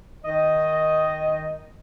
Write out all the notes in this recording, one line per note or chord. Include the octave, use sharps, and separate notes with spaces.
D#3 D#5